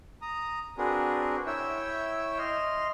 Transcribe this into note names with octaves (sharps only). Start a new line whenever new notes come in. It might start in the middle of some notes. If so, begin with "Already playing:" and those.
A#5 D#6
C4 D4 F#4 G#4 A#4 B4
E4 C#5 E5 G5 E6
D#5 C6 F6